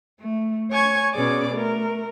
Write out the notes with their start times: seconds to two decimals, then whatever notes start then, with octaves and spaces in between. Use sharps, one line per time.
0.19 A3
0.70 C#5 G#5 C#6 G#6
1.13 B2 C#4 G#4 D5 D6
1.54 A3 A#4